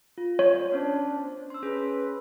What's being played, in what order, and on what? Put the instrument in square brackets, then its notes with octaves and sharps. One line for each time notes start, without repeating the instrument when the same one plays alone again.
[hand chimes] F4
[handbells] C#5
[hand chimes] B3 C#4 C5 [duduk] D4
[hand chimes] C6 E6
[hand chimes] C#4 G#4 [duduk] B4